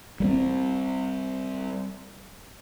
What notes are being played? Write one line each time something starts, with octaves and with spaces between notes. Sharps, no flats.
G3 G#3 C4